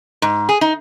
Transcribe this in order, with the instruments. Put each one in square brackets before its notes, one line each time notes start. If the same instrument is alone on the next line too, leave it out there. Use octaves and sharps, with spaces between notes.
[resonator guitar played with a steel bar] G#2
G#4
D#4